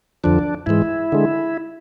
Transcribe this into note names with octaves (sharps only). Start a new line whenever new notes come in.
F2 D3 F3 D4
G#2 E3 G#3 E4
D3 G#3